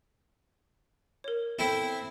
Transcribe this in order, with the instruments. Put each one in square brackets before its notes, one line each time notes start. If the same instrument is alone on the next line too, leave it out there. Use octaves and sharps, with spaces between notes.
[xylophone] A#4 C#5
[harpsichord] C4 E4 [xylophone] A4